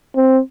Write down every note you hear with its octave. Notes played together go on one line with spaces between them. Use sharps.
C4